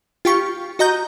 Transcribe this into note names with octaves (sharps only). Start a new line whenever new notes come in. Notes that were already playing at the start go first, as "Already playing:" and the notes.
F4 G4 C#6
F#4 D#5 A#5 G6